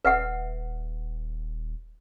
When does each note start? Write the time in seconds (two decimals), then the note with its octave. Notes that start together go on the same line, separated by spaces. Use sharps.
0.05 D#1 B4 E5 F#5